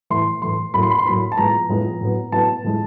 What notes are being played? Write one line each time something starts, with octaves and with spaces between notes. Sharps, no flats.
A2 E3 A3 C6
A2 E3 A3 C6
A2 F#3 A#3 B5
C6
B5
C6
A2 F#3 A#3 B5
A5
A2 F3 G#3 B3 A#5
A2 F3 G#3 B3
A2 F#3 B3
A2 F#3 B3 A5
A2 F3 G#3